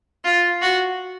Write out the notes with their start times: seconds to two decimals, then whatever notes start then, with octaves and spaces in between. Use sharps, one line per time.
0.25 F4
0.62 F#4